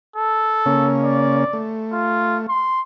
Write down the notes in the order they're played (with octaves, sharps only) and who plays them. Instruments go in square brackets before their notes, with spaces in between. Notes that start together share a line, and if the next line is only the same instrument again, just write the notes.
[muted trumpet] A4
[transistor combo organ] C#3 A#3 C#4
[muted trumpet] D5
[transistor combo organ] A3
[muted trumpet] F4
C6